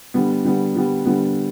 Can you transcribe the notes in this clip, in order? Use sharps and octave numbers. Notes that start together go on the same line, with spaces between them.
D3 G3 B3
D3 G3 B3
D3 G3 B3
D3 G3 B3